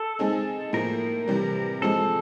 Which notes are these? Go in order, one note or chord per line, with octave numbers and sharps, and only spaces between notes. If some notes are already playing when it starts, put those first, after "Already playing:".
Already playing: A4
G#3 C4 D#4 G#4
A2 F3 A#3 A#4
C3 E3 G3
F3 G#3 C4 A4